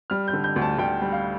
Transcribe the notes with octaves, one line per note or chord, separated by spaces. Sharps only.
G3 F6
G6
D3
G6
D2
A5
D2 G5
G3
F5